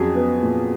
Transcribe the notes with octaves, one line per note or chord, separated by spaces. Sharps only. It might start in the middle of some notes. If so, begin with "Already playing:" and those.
Already playing: F2 F#3 C#4 G#4
B3
A#2